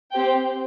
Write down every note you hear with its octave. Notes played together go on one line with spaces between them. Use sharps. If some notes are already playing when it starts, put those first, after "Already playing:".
C4 G4 C5 G5